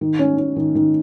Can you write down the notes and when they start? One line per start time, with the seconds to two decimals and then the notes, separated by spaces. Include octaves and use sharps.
0.01 D#3
0.19 C#4
0.38 C#4
0.56 D#3
0.75 D#3